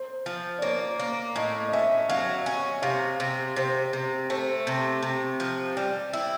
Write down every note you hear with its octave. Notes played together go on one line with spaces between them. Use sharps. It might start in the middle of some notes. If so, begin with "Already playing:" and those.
Already playing: C5
F3
D5
A#3 C#5
A#3
A2 D#5
D#5
C#4 E5
F#3 F5
C#4
C3 F5
C3
C3 C5
C3
A3 C5
C3
C3
F3
G3 D5
E4